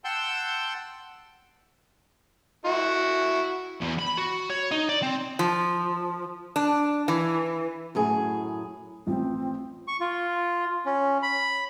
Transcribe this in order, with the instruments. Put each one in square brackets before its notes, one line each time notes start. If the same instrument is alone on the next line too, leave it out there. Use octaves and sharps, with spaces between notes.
[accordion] F#5 G5 A5 C6 E6 G6
[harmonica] E4 F#4
[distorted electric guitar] E2
B5
F#4
C#5
D#4
D5
C4
[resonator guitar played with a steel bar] F3
D4
E3
[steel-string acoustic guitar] F#2 A2 G#4
[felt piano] A1 F3 [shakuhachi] C4
[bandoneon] C#6
F4
C#4
B5